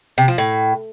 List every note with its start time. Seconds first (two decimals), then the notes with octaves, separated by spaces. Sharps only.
0.18 C3
0.28 F3
0.38 A2